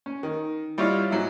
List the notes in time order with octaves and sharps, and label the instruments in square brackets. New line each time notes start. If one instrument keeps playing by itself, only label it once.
[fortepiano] C#4
D#3
G3 E4 F4 C#5 D#5 F5
G#2 F#3 E4